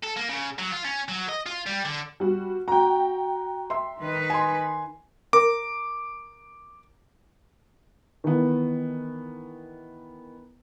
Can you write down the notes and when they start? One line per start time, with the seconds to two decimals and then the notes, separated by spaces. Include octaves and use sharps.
0.03 A4
0.16 A#3
0.29 C#3
0.59 F#3
0.72 F4
0.85 C#4
1.09 F#3
1.29 D#5
1.46 F4
1.66 G3
1.85 D3
2.20 G3 F#4
2.68 F#4 G5 A#5
3.70 E5 C6
4.01 D#3 D#4 B4
4.30 G#5 C6
5.33 A#4 D6
8.24 D#3 E3 B3